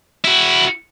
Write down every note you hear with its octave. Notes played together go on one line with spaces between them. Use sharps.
E4 F#4